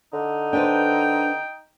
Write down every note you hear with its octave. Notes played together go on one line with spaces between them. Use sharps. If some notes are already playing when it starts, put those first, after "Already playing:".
D3 D#4
D4 B4 C5 G5